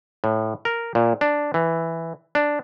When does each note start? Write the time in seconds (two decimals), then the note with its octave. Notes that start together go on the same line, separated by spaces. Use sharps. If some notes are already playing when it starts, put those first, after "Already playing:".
0.24 A2
0.65 A#4
0.95 A#2
1.21 D4
1.54 E3
2.35 D4